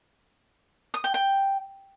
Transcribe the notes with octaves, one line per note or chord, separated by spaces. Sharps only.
D#6
G5
G5